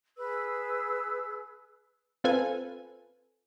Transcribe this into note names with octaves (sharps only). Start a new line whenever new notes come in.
G#4 B4 E6
C4 F4 A4 B4 G#5